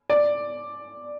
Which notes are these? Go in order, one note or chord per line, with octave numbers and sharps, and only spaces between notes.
D5